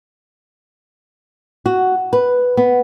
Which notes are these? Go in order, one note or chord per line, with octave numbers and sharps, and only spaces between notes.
F#4
B4
B3